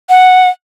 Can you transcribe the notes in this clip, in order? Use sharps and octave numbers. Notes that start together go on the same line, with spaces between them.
F#5